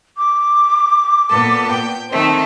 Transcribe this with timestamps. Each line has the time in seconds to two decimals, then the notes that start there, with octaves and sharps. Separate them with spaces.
0.17 D6
1.30 A#2 B3 A4
1.71 G5
2.11 D#3 A3 C4